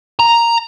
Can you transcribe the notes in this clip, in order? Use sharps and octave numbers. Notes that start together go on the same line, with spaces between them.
A#5